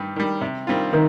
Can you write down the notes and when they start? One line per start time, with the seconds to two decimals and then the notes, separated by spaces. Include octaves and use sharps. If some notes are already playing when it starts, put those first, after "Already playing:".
Already playing: G2 D#3 G3
0.16 D#3 G3
0.41 C3
0.67 D#3 G3 C4 F4
0.93 C3 D#3